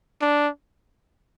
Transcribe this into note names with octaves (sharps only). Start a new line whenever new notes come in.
D4